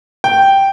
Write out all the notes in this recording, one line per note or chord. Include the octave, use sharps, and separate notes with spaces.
G5